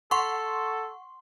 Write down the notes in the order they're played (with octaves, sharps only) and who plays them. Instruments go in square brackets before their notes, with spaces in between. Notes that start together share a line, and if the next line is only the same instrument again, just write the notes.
[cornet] A4 [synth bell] F#5 C#6 [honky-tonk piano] C6